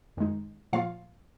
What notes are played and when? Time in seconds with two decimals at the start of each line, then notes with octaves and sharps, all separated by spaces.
0.17 F#2 D#3 G#3 D#4
0.73 A#2 F3 A#3 F4 F5